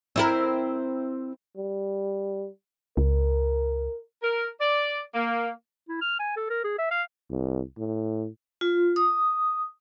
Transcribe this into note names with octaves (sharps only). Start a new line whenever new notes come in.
C4 E4 A#4
G3
C#2 A#4
A#4
D5
A#3
E4
F6
G#5
A4
A#4
G#4
E5
F5
C2
A2
F4
D#6